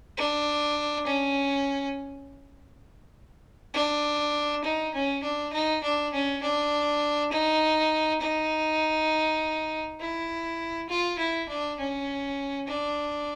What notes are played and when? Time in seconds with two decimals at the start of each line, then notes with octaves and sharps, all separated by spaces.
0.17 D4
1.06 C#4
3.74 D4
4.64 D#4
4.94 C#4
5.23 D4
5.53 D#4
5.83 D4
6.13 C#4
6.43 D4
7.32 D#4
8.21 D#4
10.00 E4
10.89 F4
11.18 E4
11.49 D4
11.79 C#4
12.68 D4